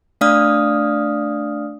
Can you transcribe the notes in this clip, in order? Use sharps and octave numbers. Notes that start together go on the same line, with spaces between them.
A3 D4 D5 F5 D#6 F6